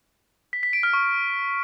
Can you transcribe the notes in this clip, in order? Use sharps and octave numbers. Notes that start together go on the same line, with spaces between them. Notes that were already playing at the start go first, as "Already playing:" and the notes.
B6
B6
D7
F6
C#6